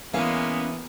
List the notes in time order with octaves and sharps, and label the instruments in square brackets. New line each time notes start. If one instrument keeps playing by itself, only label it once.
[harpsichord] E3 [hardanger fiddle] G#3 A#3 [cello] B3 [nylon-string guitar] C#4 F5